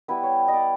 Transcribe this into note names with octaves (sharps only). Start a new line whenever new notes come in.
G3 B3 E4 B4
C#5
D#5
D5